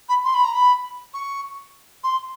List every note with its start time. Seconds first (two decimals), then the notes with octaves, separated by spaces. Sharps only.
0.09 B5
0.24 C6
0.34 B5
0.44 A#5
0.55 B5
1.14 C#6
2.04 C6